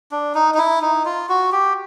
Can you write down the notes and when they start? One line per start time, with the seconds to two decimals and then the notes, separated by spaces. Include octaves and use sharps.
0.12 D4
0.35 D#4
0.54 D#4
0.58 E4
0.82 D#4
1.05 F4
1.29 F#4
1.52 G4